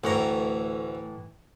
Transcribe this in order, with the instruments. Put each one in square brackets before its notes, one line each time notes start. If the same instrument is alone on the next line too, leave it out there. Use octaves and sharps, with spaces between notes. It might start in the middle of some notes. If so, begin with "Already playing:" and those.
[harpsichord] D2 C#5 A#5 [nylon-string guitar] A2 E3